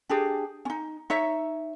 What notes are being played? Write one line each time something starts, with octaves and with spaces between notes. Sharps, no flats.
D4 G4 G#4
C#4 D#4
D#4 C#5 E5